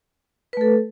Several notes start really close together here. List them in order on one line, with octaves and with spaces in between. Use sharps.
B4 A3 A4